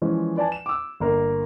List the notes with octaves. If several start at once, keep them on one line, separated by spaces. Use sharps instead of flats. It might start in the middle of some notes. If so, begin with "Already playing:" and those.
E3 F3 G#3 C#4
B4 D5 G#5 A5
E7
D6 E6
G1 A#3 A#4